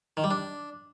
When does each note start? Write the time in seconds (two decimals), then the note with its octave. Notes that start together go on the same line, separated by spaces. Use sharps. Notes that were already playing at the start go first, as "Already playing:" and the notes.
0.17 D#3
0.24 G3
0.31 D4